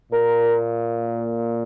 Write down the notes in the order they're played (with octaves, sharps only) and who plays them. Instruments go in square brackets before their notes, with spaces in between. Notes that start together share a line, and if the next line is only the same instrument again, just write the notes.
[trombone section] A#2 A#3 A#4